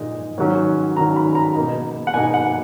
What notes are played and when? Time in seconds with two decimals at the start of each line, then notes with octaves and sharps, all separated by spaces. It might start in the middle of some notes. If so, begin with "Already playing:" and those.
Already playing: A#2 G#3 D#4
0.38 G#2 D#3 F#3 C#4
0.96 G#2 D#3 F#3 C#4 A#5
1.16 B5
1.35 A#5
1.55 B2 A#3 D#4
2.07 F#5
2.14 B2 A#3 D#4 G#5
2.34 F#5